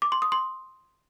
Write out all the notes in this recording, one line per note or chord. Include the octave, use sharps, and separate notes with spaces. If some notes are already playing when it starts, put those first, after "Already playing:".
D6
C6
D#6
C6